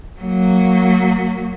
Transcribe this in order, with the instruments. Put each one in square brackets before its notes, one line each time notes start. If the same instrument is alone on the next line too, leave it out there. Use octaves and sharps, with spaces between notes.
[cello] F#3 A#3